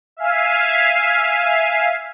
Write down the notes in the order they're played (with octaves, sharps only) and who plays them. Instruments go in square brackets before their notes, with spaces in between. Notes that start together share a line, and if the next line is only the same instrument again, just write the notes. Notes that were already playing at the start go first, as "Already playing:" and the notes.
[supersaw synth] E5 F5 G#5